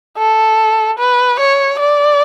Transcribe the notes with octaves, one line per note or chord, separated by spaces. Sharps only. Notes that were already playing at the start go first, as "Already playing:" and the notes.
A4
B4
C#5
D5